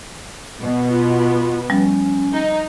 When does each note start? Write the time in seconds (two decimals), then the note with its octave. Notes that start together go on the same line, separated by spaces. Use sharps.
0.59 B2 B3
0.90 F4
1.70 F3 G3 C#4 A6
2.33 D#4